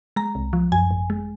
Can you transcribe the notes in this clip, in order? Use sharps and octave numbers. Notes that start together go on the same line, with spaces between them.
G#3 A#5
C2
F3
F#2 G#5
G#1
G#3